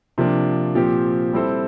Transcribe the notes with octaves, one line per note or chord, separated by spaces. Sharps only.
C3 F3 A#3 D4
A#2 F3 C4 G4
G3 C4 E4 A4 C5